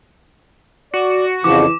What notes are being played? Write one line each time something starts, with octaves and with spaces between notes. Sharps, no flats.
F#4 D5
F2 C#3 E3 F3 D6